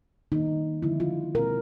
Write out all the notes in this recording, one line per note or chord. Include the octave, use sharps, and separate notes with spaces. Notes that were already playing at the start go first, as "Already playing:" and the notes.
D#3 G3 A#3 D#4
D3 F3 G#3 B3 E4
F4
B2 G#3 C4 A#4